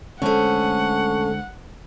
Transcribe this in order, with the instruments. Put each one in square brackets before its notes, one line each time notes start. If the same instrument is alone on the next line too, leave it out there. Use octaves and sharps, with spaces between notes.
[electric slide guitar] D3 G#3 C5 [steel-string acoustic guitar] A3 C#4 [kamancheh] F#5 [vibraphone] A5 C#6